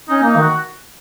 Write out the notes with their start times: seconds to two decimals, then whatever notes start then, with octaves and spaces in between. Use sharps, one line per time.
0.09 C#4 D#4
0.23 A#3 D#4
0.37 D#3 F#4